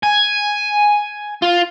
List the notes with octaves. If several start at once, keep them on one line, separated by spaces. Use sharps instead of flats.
G#5
F4